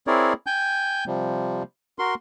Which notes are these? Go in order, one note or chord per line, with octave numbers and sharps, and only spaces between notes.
C4 E4 G#4 A#4 C#5 D5
G5 G#5 G6
C3 F3 G3
F#4 A#4 C6